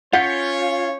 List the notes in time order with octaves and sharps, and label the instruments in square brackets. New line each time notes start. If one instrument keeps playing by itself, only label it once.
[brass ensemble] C#4 C#5 [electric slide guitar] F4 [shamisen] F#5 [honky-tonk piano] G6 B6 C#7